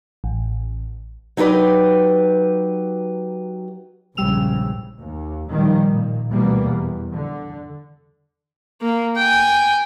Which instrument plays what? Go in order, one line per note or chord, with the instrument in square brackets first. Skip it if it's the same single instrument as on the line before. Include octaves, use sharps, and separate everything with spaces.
[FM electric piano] A1
[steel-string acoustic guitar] F#3 D#4 G4 B4 D5
[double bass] A#1 [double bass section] E2 G#2 C#3 [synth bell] G3 E6 F7
[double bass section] D#2
A#2 D#3 F3 G3
A#2
D2 B2 E3 G3 A#3 B3
E2
D3
[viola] A#3
G5 G#5